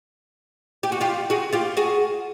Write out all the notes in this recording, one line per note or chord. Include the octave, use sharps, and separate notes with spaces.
G4
F#4
F4 G4
F#4 G#4
F4 G4
F#4 G#4